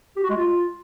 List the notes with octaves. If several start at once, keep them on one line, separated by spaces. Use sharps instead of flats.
G4
F#4
G#3
F4